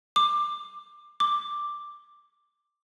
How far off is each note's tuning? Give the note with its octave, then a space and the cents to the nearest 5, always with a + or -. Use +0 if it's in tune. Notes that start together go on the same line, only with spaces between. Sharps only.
D6 +15
D6 +5